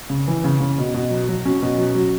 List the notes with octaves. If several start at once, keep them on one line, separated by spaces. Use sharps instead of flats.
C#3
E3
C#3
C#3
B2
B2
F#3
F#3
F#3 C#4
B2
F#3
F#3